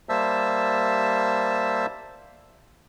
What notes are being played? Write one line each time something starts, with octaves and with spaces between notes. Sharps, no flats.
G3 A#3 C5 E5 A5 E6